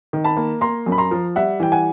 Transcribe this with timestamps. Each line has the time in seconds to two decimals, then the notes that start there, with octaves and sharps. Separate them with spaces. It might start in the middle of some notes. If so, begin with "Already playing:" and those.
0.13 D#3
0.24 A5 B5
0.37 A#3
0.61 A#3 A#5 C6
0.86 F#2
0.92 B5
0.98 A#5 C6
1.11 F3
1.36 G3 E5 F#5
1.60 E3 G5
1.72 F#5 G#5